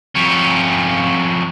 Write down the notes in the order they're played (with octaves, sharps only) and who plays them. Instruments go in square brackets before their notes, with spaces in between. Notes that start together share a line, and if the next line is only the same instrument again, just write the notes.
[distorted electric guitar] F2 C#4